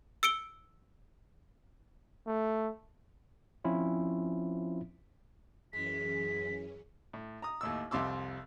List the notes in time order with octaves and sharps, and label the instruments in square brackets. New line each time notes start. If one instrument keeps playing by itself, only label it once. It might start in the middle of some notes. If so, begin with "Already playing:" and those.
[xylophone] E6 C#7 D7 G7
[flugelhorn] A3
[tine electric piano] F3 C4 C#4 E4 F4
[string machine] F#2 E3 C#4 [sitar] G#3 [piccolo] B6
[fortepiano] A2
A#5 D#6
D#2 A2 E6
C2 F2 C3 C6 D6 E6